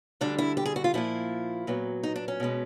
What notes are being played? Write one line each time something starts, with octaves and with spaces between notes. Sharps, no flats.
D2 D3 G3 D4
E4
G4
G#4
F#4
F4
A#2 F3 A#3 E4
A#2 F#3 B3
D#4
D4
C#4
B2 G#3 B3